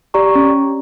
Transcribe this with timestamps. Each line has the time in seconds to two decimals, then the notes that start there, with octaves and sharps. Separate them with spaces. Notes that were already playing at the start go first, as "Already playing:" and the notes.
0.14 G4 D5 A#5 C#6
0.35 C#4